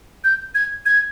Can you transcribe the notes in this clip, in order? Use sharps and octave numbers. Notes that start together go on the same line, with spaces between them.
G6
G#6
G#6